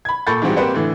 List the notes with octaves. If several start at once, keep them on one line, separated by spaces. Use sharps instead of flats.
B5 G#6
A#2 A4 B5 C#6 G6 A6
G#2 E3 G3 C4 F#4 G4
A#3 C4 G4 B4 C5 F#5
A2 D3 E3